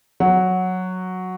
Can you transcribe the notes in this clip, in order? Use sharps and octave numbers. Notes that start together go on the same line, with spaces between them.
F#3